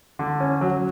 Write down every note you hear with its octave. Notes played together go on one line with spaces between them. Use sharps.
D3
C#4
F#3